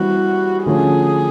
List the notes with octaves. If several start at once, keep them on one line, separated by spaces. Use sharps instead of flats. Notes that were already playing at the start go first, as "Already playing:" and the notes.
Already playing: E3 G3 C4 F#4
D3 F3 A3 C#4 G#4